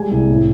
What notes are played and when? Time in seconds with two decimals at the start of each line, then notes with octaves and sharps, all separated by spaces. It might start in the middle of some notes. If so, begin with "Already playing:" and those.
Already playing: G3 G#3 G#5
0.11 C2
0.29 A2